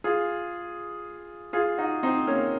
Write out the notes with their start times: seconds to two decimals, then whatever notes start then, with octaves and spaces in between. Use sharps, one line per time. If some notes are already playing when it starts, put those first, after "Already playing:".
0.04 F4 G#4
1.53 F4 G#4
1.78 D#4 F#4
2.03 C4 D#4
2.27 A#3 C#4